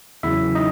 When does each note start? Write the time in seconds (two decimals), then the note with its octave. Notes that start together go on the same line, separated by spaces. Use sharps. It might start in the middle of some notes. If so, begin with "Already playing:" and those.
0.23 E2 C#3 F#3 E4 E5
0.55 D#4 D#5